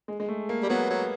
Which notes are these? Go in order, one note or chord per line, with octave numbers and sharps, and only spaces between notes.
G#3
G#3
A3
A#3
G3
F#3 B3
F#3